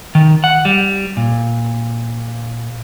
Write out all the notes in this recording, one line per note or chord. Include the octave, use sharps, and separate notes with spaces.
D#3
F#5
G3
A#2